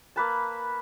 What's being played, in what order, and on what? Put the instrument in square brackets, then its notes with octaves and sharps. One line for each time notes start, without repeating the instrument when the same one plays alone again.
[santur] A#3 B4 A5